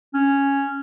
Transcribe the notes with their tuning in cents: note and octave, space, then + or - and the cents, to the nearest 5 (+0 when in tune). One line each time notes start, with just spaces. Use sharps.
C#4 -5